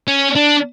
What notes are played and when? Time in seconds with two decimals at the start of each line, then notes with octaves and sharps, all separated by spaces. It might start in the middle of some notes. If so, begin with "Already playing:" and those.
0.08 C#4
0.36 D4